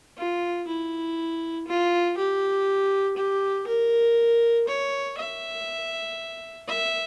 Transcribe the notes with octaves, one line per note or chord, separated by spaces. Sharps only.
F4
E4
F4
G4
G4
A#4
C#5
E5
E5